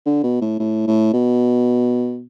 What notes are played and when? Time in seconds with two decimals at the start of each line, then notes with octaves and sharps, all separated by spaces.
0.06 D3
0.23 B2
0.41 A2
0.59 A2
0.87 A2
1.13 B2